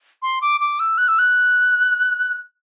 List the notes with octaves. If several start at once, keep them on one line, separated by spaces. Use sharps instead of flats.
C6
D6
D6
E6
F#6
E6
F#6